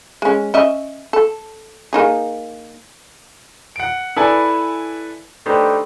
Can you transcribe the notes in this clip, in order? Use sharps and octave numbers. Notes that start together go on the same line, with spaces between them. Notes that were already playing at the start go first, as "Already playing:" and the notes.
G#3 C#4
C#4 D#5 E5
A4
A#3 D#4 G#4
F#5 D7
E4 A4 B4 D5 G#5 A5
A3 D4 D#4 G4 B4 C5